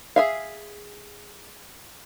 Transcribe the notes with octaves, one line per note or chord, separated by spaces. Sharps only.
G#4 E5 F5